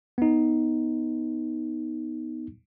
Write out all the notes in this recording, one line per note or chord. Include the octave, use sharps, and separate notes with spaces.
B3 D#4